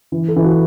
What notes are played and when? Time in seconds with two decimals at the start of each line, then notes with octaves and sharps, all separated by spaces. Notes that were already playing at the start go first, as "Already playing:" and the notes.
0.12 E3
0.28 A4
0.36 E3
0.44 F#4